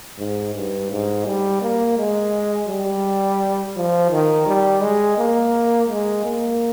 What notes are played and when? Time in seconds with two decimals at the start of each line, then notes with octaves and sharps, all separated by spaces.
0.18 G#2
0.55 G2
0.91 G#2
1.25 G3
1.61 A#3
1.97 G#3
2.68 G3
3.76 F3
4.11 D#3
4.46 G3
4.82 G#3
5.18 A#3
5.89 G#3
6.25 A#3